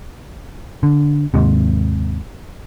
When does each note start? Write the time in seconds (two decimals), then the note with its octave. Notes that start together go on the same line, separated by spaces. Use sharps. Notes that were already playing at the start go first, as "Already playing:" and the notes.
0.83 D3
1.34 D#2 G#2 C3